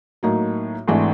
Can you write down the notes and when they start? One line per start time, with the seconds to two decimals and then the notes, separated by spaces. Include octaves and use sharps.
0.23 A2 F#3 A#3 D#4
0.88 G#1 G#2 E3 A3 D4